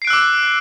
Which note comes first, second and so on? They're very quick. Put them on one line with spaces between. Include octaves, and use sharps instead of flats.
C7 D7 F#6 E6 D6